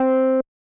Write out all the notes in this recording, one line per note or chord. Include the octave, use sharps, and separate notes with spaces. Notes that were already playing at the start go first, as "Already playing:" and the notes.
Already playing: C4